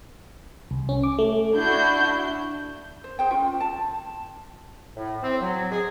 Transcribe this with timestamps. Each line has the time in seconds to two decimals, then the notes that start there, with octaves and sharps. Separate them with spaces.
0.71 C2
0.89 C#4
1.03 D6
1.19 A3
1.53 D4 E4 F#4 G6
3.04 C5
3.19 G#4 C5 G5
3.31 C#4 F4 G5
3.60 A5
4.95 A2
5.23 C4
5.41 F#3
5.71 G#4